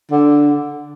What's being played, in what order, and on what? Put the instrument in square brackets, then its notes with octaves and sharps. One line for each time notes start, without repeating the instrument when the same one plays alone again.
[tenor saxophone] D3